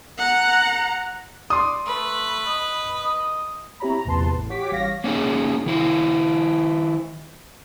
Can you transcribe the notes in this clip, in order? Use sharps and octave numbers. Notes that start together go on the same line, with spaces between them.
F#5 A#5
D5 C6 D#6
A3 B4
D#5
D#5
C4 E4 G4 C#5 A#5 B5
A#5
A#1 E2 C3 B4 A5 C6
A1
F#4 G4 C#5 D6 B6
A1 G3 C#5 F5 A#6 B6
A#3 C#4 D#4 G#4
D#3 E4 C5